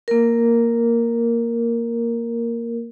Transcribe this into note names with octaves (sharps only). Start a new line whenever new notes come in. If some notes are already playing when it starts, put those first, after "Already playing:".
A#3 A#4